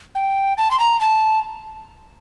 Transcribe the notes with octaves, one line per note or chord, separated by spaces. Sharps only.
G5
A5
C6
A#5
A5